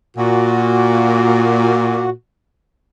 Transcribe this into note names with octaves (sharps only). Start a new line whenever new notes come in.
A#2 F#4